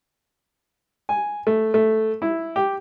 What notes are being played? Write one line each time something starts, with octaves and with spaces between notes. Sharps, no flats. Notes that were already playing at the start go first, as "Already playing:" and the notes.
G#5
A3
A3
E4
G4